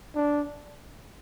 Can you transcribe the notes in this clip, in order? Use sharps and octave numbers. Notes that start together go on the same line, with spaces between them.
D4